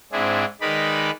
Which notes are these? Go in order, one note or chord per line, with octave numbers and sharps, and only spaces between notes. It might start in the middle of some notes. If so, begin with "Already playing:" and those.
G#2 C4 D4 E4 G#4
D#3 G#3 D#4 B4 D5 B5